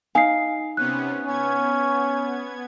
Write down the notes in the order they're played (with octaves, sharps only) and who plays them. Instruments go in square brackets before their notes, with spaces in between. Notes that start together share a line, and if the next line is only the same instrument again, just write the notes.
[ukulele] D#4 F5 [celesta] G#5 C7
[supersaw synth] C3 B3 C#4 [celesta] F#6
[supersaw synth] B3 G#6 [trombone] C#4